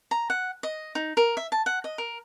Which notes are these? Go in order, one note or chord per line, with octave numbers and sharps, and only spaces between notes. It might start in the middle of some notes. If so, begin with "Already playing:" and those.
A#5
F#5
D#5
D#4
A#4
E5
A5
F#5
D#5
A#4